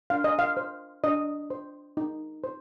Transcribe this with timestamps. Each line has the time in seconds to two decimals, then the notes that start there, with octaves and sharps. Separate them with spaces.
0.10 D4 F5
0.24 D#5
0.39 F5
0.57 C5
1.04 D4 D#5
1.50 C5
1.97 D#4
2.44 C5